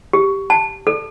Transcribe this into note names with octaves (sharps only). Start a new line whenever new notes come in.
G4
A5
A4